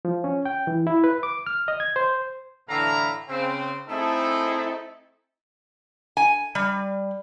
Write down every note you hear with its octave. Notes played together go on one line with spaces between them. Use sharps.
F3
C#4
G5
E3
E4
B4
D6
F6
D#5
G#6
C5
A2 D3 E3 E5 F5 A#5
C#3 C4
A3 C4 D#4 E4 G#4 A4
G#5
G3